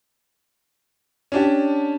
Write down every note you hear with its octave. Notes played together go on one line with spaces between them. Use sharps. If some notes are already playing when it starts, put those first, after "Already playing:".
C#4 D4 G4